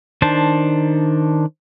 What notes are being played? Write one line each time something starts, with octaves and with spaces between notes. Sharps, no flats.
D#3 D4 C5 A5